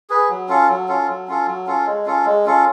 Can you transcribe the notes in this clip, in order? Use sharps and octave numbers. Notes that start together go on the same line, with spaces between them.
G#4 B4
F#3
C#4 F4 A4
F#3
C#4 F4 A4
F#3
C#4 F4 A4
F#3
C#4 F4 A4
G#3
C#4 F4 A4
G#3
C#4 F4 A4